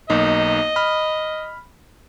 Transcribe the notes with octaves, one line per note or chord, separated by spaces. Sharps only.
B1 A#3 D#4 D#5
B5 F6